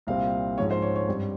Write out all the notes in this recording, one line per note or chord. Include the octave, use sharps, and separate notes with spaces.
C2 A#2 G3 C4 F5
G#2 F3 G#3 C#4 C#5
C5
C#5
C#5
G2 G3 C4